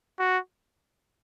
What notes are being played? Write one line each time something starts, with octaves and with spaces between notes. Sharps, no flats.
F#4